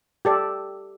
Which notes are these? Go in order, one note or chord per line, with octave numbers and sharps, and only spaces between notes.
G4 A4 D5